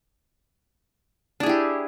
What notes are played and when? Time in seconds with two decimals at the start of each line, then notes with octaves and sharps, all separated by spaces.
1.40 D4
1.43 G#4
1.46 E4
1.49 G4